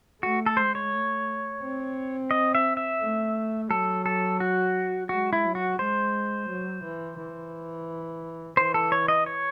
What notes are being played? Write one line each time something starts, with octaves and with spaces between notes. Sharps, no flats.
A3 F#4
A4
G#3 C5
C#5
A3
C4
D#5
E5
E5
A3
F#3 A4
A4
F#4
G#3 F#4
E4
F#3
F#4
G#3 C5
F#3
E3
E3
E3 C5
A4
C#5
D#5
C#5